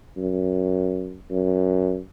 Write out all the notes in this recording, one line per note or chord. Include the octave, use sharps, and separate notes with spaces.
F#2
F#2